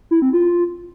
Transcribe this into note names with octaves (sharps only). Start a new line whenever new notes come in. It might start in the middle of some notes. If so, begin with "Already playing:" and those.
E4
C4
F4